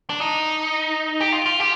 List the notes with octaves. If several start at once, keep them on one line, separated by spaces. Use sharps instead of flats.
D4
D#4
G4
F4
F4
G4